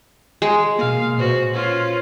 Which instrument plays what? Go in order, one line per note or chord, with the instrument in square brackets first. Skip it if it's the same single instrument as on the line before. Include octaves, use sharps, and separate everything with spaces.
[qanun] G#3
[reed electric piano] B2 A#3 [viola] F5
[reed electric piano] A#2 B4 C5 [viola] F#4
[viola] C#4 F4